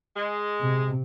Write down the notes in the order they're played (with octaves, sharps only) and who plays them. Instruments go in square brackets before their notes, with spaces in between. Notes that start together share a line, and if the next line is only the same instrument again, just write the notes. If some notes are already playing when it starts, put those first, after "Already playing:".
[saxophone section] G#3
[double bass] C3